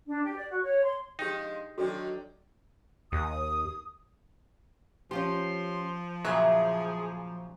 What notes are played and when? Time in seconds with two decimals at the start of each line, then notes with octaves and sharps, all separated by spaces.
0.07 D4
0.23 G4
0.36 D5
0.50 F#4
0.63 C#5
0.84 C6
1.19 F3 G#3 D4 D#4 G4 G5
1.78 D3 D#3 F#3 C4 D4 F#4 A4
3.12 D#2 D#6
5.11 F3 C#4 F4 G4 C6
6.25 A#2 C#3 F#3 G#4 E5